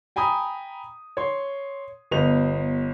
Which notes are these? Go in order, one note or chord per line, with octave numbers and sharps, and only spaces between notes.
G5 G#5 A#5 B5 D#6
C#5 C6
G1 B3 D#5 F7